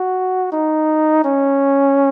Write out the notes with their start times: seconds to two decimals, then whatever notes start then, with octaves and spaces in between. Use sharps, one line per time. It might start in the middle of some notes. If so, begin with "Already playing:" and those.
Already playing: F#4
0.52 D#4
1.24 C#4